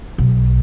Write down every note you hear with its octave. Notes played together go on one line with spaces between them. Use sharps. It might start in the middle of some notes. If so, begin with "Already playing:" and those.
B1